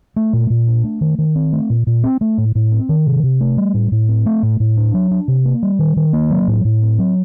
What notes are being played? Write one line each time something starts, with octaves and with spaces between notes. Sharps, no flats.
A3
A#2
A#2
D4
A3
D#3
D#3
C4
A3
A#2
A#2
C4
A3
A2
A2
C4
D#3
C3
C3
A3
G3
A2
A2
C4
A3
A2
A2
D4
F#3
D4
C3
A#3
G3
D#3
D#3
A#3
F#3
A2
A2
C4
F#3